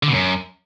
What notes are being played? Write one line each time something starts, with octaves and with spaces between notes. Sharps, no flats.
D3
B2
F#2